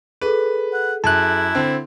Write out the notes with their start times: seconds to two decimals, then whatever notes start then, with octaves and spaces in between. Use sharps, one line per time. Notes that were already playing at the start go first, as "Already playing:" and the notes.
0.21 G#4 A4 B4
0.73 F#5
1.04 F#2 E4 A5 F#6
1.55 D3 C4